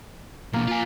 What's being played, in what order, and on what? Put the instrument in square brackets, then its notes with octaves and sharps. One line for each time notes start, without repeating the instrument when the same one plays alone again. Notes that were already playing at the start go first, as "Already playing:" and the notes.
[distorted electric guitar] B2 E3 [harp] A#3
[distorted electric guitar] F4 G#5